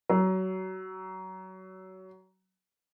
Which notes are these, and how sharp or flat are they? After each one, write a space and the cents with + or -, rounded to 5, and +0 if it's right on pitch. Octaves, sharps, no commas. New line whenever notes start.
F#3 +25